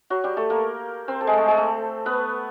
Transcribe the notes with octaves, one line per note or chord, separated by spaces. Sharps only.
F#3 F#4
G3 G4
A3 A4
A#3 A#4
C4 C5
A4
G#3 G#4
A3 A4
G#3 G#4
A3 A4
B3 B4